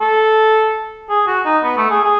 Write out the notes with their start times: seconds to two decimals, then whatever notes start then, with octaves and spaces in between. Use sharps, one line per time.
0.01 A4
1.10 G#4
1.27 F#4
1.46 D#4
1.64 B3
1.77 A3
1.91 G#4
2.05 G#4